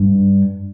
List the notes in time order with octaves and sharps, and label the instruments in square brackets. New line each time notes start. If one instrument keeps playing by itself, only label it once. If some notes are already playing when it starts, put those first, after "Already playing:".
Already playing: [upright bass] G2